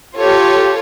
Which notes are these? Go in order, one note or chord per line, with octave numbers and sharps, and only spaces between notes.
F4 G4 A4 C#5